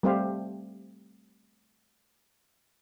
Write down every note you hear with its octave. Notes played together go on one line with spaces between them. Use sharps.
G3 A3 C4 G4 C5 F5